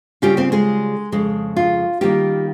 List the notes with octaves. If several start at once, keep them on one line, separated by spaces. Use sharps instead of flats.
C#3 G3 C#4 F4 G4 G5
C4 C5
G#3 G#4
F2 C#3 G#3
F4
D#3 G3 A#3 F4 G4